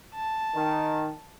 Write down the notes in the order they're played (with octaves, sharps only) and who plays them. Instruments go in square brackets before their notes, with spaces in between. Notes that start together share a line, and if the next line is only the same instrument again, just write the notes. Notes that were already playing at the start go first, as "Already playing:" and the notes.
[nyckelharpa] A5
[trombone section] D#3